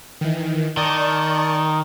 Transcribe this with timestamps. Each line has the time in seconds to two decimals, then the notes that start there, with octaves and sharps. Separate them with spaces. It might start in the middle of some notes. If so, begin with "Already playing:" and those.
0.21 D#3 E3
0.77 D#3 D5 A5 C#6